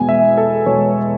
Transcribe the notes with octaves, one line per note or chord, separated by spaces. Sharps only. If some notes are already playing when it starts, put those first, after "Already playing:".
Already playing: E2 B2 G#3 B3 G#5
E5
A4
E2 B2 G#3 B3 C#5